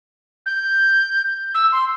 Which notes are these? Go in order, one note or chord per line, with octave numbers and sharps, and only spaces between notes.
G6
E6
C6